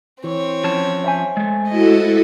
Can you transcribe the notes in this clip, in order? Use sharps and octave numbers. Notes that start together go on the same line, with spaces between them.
E3 C4 C#5
F3 C#4 A5
C5 E5 G#5
G#3 A3
E4 F#4 A4 D#5